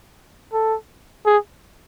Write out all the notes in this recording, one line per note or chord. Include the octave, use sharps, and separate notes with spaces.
A4
G#4